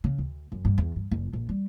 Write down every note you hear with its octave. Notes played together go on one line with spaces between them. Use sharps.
C#3
D2
F#2
G2
E2
G2
F#1
A#1
G3